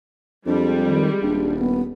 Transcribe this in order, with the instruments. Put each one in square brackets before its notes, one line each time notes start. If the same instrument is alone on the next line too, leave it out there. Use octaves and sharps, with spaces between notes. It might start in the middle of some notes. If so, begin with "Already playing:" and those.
[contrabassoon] F2 [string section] G3 G#3 [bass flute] D4
[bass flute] D#3
[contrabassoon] D#1 [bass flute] D4
[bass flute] B3